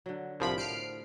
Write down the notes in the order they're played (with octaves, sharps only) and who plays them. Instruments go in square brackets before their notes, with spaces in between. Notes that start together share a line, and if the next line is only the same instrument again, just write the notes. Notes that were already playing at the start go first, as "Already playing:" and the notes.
[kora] D3 F#3
[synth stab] C2 F3 B5 [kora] A2 A#4 C5
[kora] C5 F5 [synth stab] F6 C7 D7